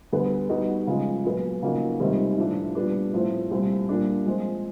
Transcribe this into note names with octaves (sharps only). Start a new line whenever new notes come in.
D2 D3 G3 B3
G3 B3 D#4 F#4
C#3 F3 G#3
A#2 F#3 B3
C#3 F3 A#3 D#4 F#4
C#2 C3 D#3 G3 C4
A2 F3 A3 D4
A#2 G3 B3 D4
A2 F3 A3 C4
C2 A#2 G3 C4
A#2 G3 A#3 D4
F3 G#3 C4